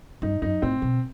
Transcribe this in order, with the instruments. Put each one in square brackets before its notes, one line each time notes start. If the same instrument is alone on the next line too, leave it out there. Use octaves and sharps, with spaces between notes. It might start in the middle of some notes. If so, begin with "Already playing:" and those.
[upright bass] G2 [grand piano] D#4
[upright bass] F#2 [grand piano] D#4
[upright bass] A2 [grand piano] C4
[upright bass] B2